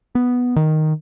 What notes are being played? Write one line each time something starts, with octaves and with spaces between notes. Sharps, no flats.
B3
D#3